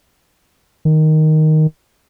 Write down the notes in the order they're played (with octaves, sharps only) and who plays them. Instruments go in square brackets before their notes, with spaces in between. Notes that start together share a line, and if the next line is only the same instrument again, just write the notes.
[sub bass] D#3